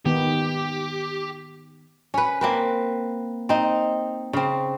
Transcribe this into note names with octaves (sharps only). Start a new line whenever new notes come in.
D#3 B3 D#4 G4
C#4 B4
A#3 C4 B4
C4 D#4
C#3 C4